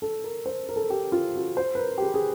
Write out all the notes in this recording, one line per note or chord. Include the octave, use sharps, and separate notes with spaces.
A4
A#4
C5
A#4
A4
A#4
G4
F4
F#4
C5
B4
A#4
G4
G#4
G#4